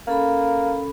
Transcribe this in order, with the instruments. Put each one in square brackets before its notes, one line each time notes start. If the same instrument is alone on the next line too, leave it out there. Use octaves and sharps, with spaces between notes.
[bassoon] A#3 [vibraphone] C#4 A4 B5